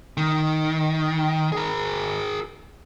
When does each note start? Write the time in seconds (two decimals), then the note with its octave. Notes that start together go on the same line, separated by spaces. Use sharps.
0.17 D#3
1.52 G#4 A#4